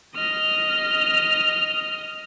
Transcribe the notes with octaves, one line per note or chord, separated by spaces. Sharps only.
D#5 F6